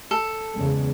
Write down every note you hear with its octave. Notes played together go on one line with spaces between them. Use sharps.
A4
E2 C#3 G#3